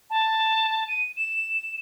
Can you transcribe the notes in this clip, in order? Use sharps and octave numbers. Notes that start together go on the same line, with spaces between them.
A5
D#7
E7